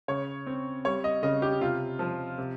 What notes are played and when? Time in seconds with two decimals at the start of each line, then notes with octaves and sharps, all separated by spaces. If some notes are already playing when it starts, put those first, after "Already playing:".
0.08 C#3 C#5
0.47 C4
0.85 G3 C#5
1.04 D#5
1.23 C#3 D#5
1.42 G4
1.61 C3 F4
1.99 F3
2.38 C3